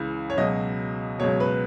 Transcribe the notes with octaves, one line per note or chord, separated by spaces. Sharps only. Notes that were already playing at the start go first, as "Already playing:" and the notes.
Already playing: C#2 C#3 E3
C#5
C#2 B2 F#3 D#5
C#2 B2 F#3 C#5
B4